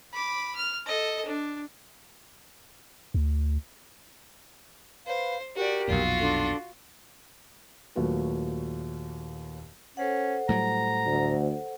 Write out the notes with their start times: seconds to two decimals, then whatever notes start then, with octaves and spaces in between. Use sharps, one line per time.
0.14 B5 D6
0.55 F6
0.86 A4 D#5
1.25 D4
3.14 D2
5.07 B4 C5 F5
5.56 F#4 G4 A#4 D5
5.88 B1 F2 A#2 F4 F#4
6.20 D4 A4 C6
7.95 D#2 A#2 F#3 A3 F#4 B4
9.97 C#4 A4 C5 F#5
10.49 A2 F#3 G3 A#5
11.06 D2